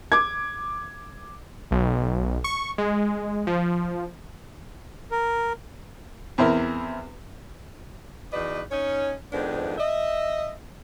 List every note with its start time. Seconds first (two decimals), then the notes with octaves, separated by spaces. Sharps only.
0.12 D6 G#6
1.71 B1
2.44 C#6
2.78 G#3
3.47 F3
5.11 A#4
6.38 E2 C4 E4 A#4
8.33 E2 D#4 F#4 B4 D5 D#5
8.71 C#4 D#4 C#5
9.33 F2 G#2 D#3 F3 B3 D4
9.78 D#5 E5